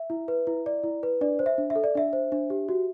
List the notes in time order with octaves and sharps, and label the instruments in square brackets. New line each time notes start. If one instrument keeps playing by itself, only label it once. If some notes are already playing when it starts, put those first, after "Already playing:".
Already playing: [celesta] E5
E4
B4
E4
D5
E4
B4
D4 D5
C5
E5
D4
E5
A4
D5
D4 E5
C5
D4
G4
F#4